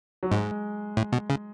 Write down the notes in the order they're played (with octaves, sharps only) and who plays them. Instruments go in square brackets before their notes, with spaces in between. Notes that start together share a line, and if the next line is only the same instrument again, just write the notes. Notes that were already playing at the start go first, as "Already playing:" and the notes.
[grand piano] F#3
[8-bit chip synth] G#2 [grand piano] G#3
[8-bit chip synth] A2
B2
C#3